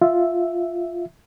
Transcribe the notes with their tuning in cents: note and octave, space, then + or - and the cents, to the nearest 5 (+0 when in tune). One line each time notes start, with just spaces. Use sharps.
F4 +0 E5 +0